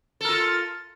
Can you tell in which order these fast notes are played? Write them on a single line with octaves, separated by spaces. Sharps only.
A4 A#4 F4